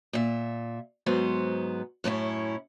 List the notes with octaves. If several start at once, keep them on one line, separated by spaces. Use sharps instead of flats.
A#2 E5
G#2 F#3 B3 C5
F#2 A2 C#4 E4